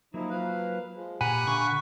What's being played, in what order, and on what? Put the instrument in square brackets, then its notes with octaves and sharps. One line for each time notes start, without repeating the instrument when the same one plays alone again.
[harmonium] F3 D#4 E4 [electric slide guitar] F#3 A#3
[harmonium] F3 B4 F5
F3 G#3
[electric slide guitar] A#2 A#5 [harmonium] G4 [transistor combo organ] F#5 B5 [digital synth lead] G#5
[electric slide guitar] D3 F5 G#5 [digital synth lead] C#6